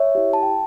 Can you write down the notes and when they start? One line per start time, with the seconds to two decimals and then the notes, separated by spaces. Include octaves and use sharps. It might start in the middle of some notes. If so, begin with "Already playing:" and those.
Already playing: C#5 E5
0.15 E4 G4
0.33 A5
0.43 G5